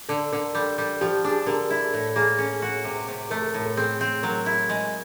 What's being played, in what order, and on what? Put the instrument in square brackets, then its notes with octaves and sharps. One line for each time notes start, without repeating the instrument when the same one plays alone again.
[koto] D3 [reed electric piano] A4
[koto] D3 [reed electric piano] A#4
[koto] G3 [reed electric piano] A4
[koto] G3
[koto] F3 [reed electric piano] G4
[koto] D4 [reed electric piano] G#4
[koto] D3 [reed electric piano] A#4
[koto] E4
[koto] A2 [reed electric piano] A4
[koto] A#3 [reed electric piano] G#4
[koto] C#4
F#4
C3
C3
[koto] A3 [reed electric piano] A#4
[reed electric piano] A4
[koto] A2 [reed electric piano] A#4
[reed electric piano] A4
[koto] C4 [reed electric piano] G#4
[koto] C4
[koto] F#3 [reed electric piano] A#4
[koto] E4
G#3